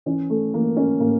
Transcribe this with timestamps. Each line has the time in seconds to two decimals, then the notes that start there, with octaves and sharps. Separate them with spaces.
0.06 E3 C#4
0.30 A3
0.53 E3 A#3
0.77 C#4
1.00 A2 A#3